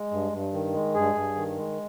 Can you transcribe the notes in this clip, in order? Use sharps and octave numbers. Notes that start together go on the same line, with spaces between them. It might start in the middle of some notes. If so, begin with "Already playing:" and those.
Already playing: G#3
G2
G2
D#3
G#3
G2 G#4
G2
D#3
G#3